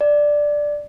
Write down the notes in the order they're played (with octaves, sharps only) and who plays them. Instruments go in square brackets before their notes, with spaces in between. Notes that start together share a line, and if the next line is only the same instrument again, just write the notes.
[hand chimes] D5